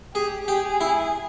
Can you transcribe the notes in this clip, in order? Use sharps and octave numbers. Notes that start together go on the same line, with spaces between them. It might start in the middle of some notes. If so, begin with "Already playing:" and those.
G4 G#4
G4 G#4
E4